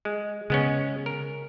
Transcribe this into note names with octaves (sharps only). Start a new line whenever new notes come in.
G#3
C#3 G#3 B3 C#4
A#4